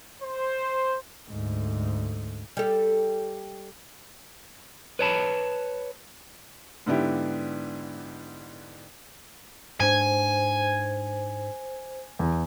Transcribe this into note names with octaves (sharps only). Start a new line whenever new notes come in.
C5
D2 G#2
G3 A4
B4 C#5 A5 B5
G#2 D3 B3 D4 E4 G4
G#2 D4 C5 G#5
E2